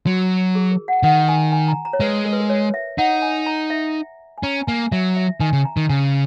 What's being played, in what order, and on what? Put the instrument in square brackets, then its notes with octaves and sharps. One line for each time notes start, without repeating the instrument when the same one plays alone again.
[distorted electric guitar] F#3 [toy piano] F#4
[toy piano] G#4
A#4
F#5
[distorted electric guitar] D#3 [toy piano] F#5
[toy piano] G#5
G#5
A#5
A#5
C#5
[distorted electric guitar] G#3 [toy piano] B4
[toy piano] A#4
B4
A#4
C#5
E5
[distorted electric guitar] D#4 [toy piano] F#5
[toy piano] G#5
A#5
E5
G#5
[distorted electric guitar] C#4 [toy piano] A#5
[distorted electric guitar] A#3 [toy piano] G#5
[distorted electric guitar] F#3 [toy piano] E5
[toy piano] E5
[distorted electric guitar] D#3 [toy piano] G#5
[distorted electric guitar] C#3
[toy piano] A#5
[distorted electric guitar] D#3
[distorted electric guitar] C#3 [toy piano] G#5